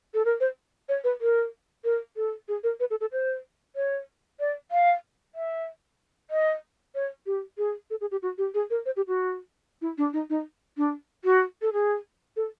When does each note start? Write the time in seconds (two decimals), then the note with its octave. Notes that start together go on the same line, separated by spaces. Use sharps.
0.14 A4
0.25 A#4
0.40 C5
0.89 C#5
1.04 B4
1.21 A#4
1.84 A#4
2.16 A4
2.48 G#4
2.63 A#4
2.80 B4
2.90 A4
3.01 A4
3.12 C5
3.76 C#5
4.40 D5
4.71 F5
5.35 E5
6.30 D#5
6.95 C#5
7.26 G4
7.58 G#4
7.90 A4
8.01 G#4
8.11 G4
8.22 F#4
8.38 G4
8.54 G#4
8.70 A#4
8.86 C5
8.96 G4
9.08 F#4
9.82 E4
9.98 D4
10.13 D#4
10.30 D#4
10.77 D4
11.24 F#4
11.62 A4
11.73 G#4
12.36 A4